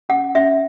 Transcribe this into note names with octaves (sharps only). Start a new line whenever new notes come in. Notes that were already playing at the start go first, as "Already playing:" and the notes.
C#4 F#5
C#4 E5